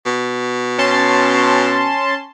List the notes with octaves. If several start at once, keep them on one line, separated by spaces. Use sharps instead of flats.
B2
C#4 A5 C6